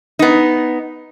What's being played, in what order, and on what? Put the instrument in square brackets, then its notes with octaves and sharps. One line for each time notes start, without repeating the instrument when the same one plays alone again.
[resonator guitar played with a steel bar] B3 D#4